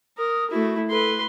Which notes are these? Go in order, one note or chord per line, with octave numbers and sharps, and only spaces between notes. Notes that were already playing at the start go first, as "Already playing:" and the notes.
A#4 D#6
A3 E4 F#4
A4 B4 C6